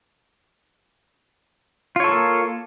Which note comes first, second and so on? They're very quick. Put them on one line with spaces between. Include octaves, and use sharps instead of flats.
F4 C#5 A4 A#3